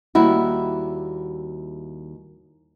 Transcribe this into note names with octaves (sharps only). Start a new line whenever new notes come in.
D#2 G3 E4 F#4